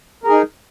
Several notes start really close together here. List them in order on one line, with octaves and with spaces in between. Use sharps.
A#4 G#4 D#4